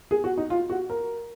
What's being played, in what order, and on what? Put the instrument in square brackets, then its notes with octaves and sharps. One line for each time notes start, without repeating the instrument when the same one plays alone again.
[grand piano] G#4
F#4
D#4
F4
F#4
A#4